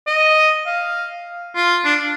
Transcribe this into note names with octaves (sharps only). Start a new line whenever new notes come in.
D#5
F5
F4
D4